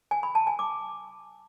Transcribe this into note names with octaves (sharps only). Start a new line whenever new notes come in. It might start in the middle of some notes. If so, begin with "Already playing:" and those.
G#5
B5
A5
G#5
D6